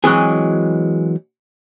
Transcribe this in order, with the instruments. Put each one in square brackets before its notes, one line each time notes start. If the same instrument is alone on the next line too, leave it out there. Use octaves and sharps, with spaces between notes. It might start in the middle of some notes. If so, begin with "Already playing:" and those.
[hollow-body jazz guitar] E3 F#3 G#3 C4 G#4